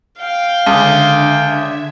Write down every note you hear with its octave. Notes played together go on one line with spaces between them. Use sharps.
F5 G5
C#2 D3 E5 G#6